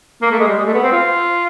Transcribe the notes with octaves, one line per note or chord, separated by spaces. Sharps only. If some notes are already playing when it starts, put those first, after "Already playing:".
A#3
A3
G#3
G3
G#3
A3
B3
C4
F4